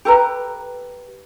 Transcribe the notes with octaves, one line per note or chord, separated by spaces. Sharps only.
G4 A4 B4 A#5